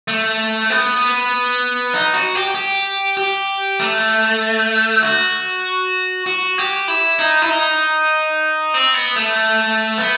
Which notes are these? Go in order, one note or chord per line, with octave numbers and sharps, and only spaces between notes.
A3
B3
D#4
F#4
G4
G4
G4
A3
F#4
F#4
G4
E4
D#4
E4
D#4
C4
B3
A3
B3